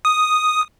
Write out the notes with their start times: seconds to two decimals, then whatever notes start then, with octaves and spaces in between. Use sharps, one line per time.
0.05 D#6